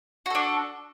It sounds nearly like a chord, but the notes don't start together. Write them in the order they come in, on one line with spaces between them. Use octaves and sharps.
F#4 A4 D4